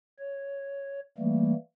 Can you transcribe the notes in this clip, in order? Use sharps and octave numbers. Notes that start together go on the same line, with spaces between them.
C#5
E3 G3 A3 A#3